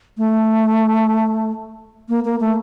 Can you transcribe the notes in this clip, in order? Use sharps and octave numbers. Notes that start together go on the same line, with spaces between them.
A3
A#3
A#3
A3